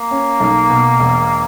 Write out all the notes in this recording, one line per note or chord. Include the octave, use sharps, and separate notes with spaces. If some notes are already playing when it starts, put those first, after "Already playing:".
Already playing: A#3
C#4
B1
B2
E1